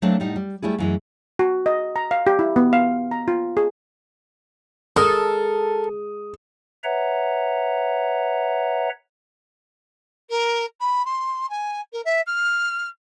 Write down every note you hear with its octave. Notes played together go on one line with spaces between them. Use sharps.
F#3 A3 A#3 C4 D4 A4
A2 G3 D#4 F#5
G3
G3 A3 E4 G#4
F#2 E3 G#3
F#4
D#5
A#5
F5
G4
E4
B3
F5
A#5
F4
G#4
G#3 A4 A#4 D#6
B4 C#5 E5 F#5 A#5
A#4
B5
C6
G#5
A#4
E5
F6